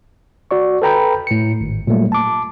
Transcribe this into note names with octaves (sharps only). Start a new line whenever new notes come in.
F#4 D5 C#6
A4 B4 G5 A#5 B5 G6
A2 C#7
G#1
A#2 F#3 G3 A3 A#3
A5 D6